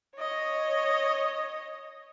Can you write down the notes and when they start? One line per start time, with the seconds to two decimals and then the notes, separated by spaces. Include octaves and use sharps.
0.18 C#5 D#5